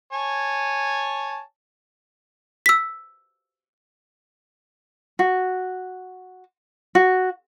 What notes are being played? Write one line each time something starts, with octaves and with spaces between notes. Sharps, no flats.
C#5 G#5 A5
E6 B6
F#4
F#4